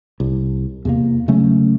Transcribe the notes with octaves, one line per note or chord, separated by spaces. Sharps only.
C2
E2 C3 A#3
C#3 F#3 A3 C#4